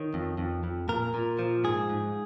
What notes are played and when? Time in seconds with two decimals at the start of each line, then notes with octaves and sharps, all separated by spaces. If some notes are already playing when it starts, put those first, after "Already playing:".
Already playing: D#3 C#5
0.14 F2
0.38 F2
0.64 F2
0.89 A#2 A#4
1.14 A#2
1.39 F3
1.64 G#2 G#4
1.89 G#2